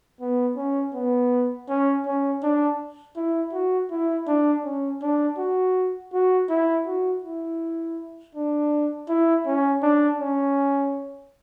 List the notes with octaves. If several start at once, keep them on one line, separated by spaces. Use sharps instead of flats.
B3
C#4
B3
C#4
C#4
D4
E4
F#4
E4
D4
C#4
D4
F#4
F#4
E4
F#4
E4
D4
E4
C#4
D4
C#4